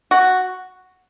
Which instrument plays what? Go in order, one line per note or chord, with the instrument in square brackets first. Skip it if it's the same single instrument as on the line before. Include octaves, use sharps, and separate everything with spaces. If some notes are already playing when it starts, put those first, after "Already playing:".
[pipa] F#4